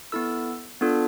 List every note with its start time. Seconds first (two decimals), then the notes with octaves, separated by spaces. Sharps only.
0.12 B3 E4 A4 E6
0.81 B3 D4 F4 A4